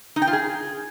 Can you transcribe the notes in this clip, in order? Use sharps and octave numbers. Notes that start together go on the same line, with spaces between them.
D#4
G5
F4
G#4